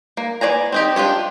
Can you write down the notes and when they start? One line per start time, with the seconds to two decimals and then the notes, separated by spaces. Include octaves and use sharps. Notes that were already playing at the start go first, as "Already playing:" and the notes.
0.17 A#3
0.41 E3 C5 D5 G#5 A#5
0.72 C4 D#4 G4
0.96 D4 F4 G4 C#5